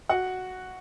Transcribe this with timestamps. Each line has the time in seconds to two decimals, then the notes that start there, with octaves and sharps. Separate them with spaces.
0.09 F#4 F#5